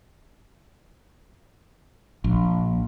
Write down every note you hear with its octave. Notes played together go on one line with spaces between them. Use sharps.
A#1